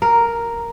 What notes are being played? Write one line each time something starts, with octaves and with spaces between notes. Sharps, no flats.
A#4